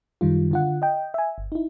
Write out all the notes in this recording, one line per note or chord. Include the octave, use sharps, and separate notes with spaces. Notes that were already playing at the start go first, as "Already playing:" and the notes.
F#2 D#3 G3 F4
D3 F4 F#5
D#5 G5
E5 G#5
G1
D#4 E4